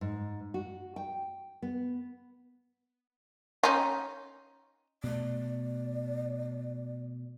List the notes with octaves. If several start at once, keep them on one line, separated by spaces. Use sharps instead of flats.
G#2
F#4
G5
B3
C#4 D#4 F4
B2 A3 D5